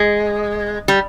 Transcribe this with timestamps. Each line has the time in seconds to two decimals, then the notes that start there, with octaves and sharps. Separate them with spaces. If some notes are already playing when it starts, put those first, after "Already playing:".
Already playing: G#3
0.88 G3